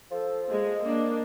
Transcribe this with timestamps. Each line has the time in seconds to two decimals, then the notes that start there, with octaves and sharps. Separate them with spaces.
0.11 F3 A4
0.51 G#3 D#5
0.82 A#3 D4